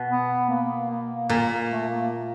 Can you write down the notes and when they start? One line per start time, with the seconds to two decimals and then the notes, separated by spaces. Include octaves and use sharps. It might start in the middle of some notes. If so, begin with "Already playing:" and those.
Already playing: B2
0.11 B3
0.49 A#3
0.90 A#3
1.29 A#2 A#3
1.70 A3
1.89 A#3